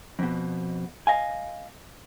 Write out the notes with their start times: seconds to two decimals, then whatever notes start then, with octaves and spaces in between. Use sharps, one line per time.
0.19 F2 B2
1.07 D#5 F5 G#5